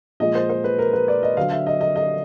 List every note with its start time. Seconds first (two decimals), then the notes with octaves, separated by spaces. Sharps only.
0.20 A#2 F3 G#3 D#5
0.35 C5
0.50 C5
0.64 B4
0.79 A#4
0.93 B4
1.08 D5
1.23 D#5
1.37 D3 F#3 F5
1.52 E5
1.67 D#5
1.81 D#5
1.96 D#5